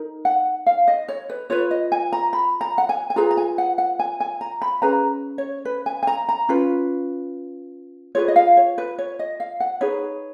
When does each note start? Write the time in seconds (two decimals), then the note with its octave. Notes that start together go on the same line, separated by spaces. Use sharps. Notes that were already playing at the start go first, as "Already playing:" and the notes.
Already playing: D#4 A#4
0.25 F#5
0.66 F5
0.88 D#5
1.08 C#5
1.30 B4
1.50 F4 B4 C#5
1.71 D#5
1.92 G#5
2.12 A#5
2.33 B5
2.61 A#5
2.78 F#5
2.89 G#5
3.10 G#5
3.16 F4 G#4 B4 A#5
3.31 A#5
3.37 G#5
3.58 F#5
3.78 F#5
3.99 G#5
4.20 G#5
4.41 A#5
4.62 B5
4.82 C#4 G#4 B4 A#5
5.38 C#5
5.65 B4
5.86 G#5
6.03 G#5
6.07 A#5
6.29 A#5
6.49 C#4 F4 B4
8.15 F4 G#4 B4 C#5
8.28 D#5
8.36 F5
8.57 C#5
8.78 B4
8.99 C#5
9.19 D#5
9.40 F5
9.60 F#5
9.81 D#4 G#4 B4 C#5